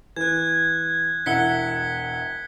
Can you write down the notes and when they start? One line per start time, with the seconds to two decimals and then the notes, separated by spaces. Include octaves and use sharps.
0.16 E3 F#6 G#6
1.26 E1 E4 F#5 B6 C#7 G7